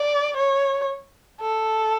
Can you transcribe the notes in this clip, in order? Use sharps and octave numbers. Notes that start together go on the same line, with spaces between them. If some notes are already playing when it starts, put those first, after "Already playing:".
Already playing: D5
C#5
A4